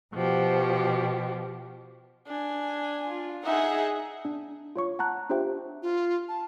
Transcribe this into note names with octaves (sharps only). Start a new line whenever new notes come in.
B2 F3 F#4 G4
D4 G#5
F4
D#4 G#4 E5 F#5
D4
F4 C#5 C#6
F#5 A5 A#5 F#6
D4 F4 G4 C5 E5 G5
F4
A5